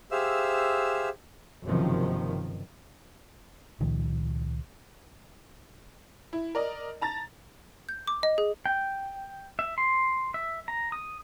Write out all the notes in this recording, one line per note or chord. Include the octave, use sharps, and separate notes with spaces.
G4 G#4 C5 E5 F5 E6
F#1 G2 C3 D#3 F3
C#2 A#2 D#3 F3
E4
A#4 D5 D#5
A5 A#5 A6
G6
D6
D#5
G#4
G5
E5
C6
E5
A#5
D#6